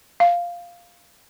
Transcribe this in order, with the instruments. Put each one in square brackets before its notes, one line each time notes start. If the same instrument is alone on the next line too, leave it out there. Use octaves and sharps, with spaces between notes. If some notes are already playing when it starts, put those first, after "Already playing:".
[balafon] F5